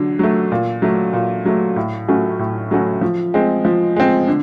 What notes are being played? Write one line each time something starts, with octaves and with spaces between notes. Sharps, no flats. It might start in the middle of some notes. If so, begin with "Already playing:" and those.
Already playing: D3 F#3
F#3 A3
A#2
F#3 A3
A#2
F#3 A3
A2
F#3 A3 C#4 F#4
A2
F#3 A3 C#4 F#4
F3
G#3 C4
F3
G#3 C4
D3